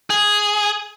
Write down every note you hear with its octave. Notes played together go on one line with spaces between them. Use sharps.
G#4